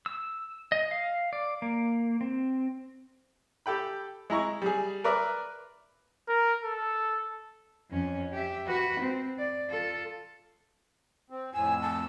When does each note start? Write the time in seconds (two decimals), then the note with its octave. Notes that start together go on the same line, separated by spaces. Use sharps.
0.06 E6
0.72 D#5
0.91 F5
1.33 D5
1.62 A#3
2.21 C4
3.66 G4 A4 G5 B5
4.30 G#3 E4 A#5 C#6
4.62 G3 G#4
5.04 A#4 B4 D5 E5
6.28 A#4
6.64 A4
7.91 F2 C#4
8.33 G4 E5
8.67 F#4 B4
9.01 C4
9.38 D5
9.69 F4 A4
11.30 C4
11.54 F2 A2 G#5 E6
11.82 A5